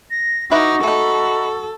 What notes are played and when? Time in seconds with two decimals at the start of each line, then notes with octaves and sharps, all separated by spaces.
0.11 A#6
0.51 D#4 E4 F#4 B4 E5 D6
0.83 A3 D#4 A4 B5